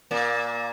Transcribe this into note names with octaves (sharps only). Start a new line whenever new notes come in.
A#2 A#3